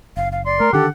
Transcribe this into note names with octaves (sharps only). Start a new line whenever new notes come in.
F#1 F5
F5
D5 C6
A3 A#4
D3 D#3 D4 G4 A4 F#5